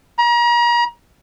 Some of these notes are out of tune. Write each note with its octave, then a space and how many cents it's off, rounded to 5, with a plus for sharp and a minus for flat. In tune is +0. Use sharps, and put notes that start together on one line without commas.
A#5 +35